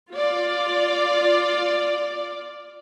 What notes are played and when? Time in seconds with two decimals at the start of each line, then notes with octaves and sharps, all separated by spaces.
0.10 F4 D5